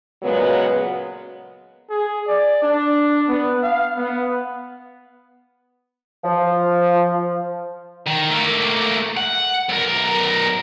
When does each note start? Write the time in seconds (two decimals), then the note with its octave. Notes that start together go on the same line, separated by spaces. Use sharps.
0.22 A#2 C#3 F#3 G#3 B3
1.90 G#4
2.28 D5
2.62 D4
3.28 B3
3.63 F5
3.96 B3
6.24 F3
8.06 D#3
8.30 A3 A#3
9.17 F#5
9.69 B1 A#4